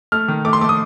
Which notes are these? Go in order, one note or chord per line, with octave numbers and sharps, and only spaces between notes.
A3 F6
D#3
A3 D6
C6
A3 D6
D#6